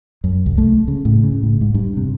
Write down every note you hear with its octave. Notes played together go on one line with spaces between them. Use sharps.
F#2
C2
A3
C#3
A2
C#3
A2
G#2
G2
C3